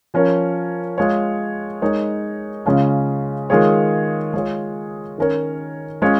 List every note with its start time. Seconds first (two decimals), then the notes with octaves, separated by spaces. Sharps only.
0.14 F3 C#4 A#4 C#5
0.98 G#3 F4 C#5
1.82 G#3 D#4 A#4 C#5
2.66 C#3 G#3 C#4 F4
3.50 D#3 G#3 F4 G#4 C#5
4.33 G#3 F4 G#4 C#5
5.18 D#3 C#4 A#4 C#5
6.02 G#3 C#4 F4 C#5